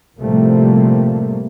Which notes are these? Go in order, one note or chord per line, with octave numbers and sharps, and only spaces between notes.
A2 C3 F3 G3 A3 A#3